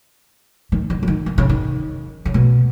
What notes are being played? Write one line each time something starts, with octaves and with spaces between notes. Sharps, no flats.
D#3
D#3
C#3
D#3
D#3
C#3
D#3
C#3
B2